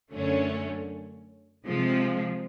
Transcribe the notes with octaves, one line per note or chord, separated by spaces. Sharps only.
F#2 D3 F#3 A3 C#4
C3 F3 G#3